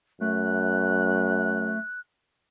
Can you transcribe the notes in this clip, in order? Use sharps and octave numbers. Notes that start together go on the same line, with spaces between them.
F#2 A3 F#6